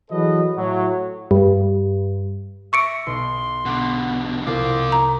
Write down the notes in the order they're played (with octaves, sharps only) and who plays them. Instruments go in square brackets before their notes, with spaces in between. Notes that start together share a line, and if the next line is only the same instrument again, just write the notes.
[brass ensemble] E3 F#3 G#4 A4 B4 D#5
A2 F#3
[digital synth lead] G2
[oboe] E5 [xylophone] C#6 C#7 D7 [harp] D6 A6 A#6
[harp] B1 [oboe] C6
[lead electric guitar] B2 D3 [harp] F#5 D6
[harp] C2 [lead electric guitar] C4 F4 [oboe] D6
[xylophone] A#5